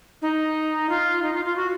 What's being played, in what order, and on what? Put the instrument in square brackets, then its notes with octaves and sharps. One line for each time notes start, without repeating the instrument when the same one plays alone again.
[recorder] D#4
F4
D#4
F4
F4
F#4